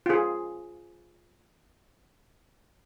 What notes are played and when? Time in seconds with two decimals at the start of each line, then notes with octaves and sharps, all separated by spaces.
0.06 F4 G#4